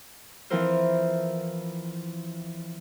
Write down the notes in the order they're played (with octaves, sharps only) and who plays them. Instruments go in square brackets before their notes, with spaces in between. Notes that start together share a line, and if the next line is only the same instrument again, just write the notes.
[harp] E3 F3 C4 E4 A#4 C5